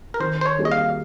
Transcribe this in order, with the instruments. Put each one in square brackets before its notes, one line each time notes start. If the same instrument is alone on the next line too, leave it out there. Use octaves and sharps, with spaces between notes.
[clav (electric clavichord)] A#4
[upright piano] D#3 [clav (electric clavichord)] C5
[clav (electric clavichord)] C5
C#5
[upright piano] G3 A#3 D#4 G#4
[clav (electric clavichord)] D#5
F5